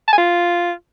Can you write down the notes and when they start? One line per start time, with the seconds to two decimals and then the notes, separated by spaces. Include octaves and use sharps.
0.08 A5
0.13 G#5
0.18 F4